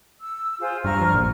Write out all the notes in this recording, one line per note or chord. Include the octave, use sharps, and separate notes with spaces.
E6
F4 G#4 C5
G2 A#5 C#6 F6
F3
A#1